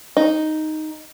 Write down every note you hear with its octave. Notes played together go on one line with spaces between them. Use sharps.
D#4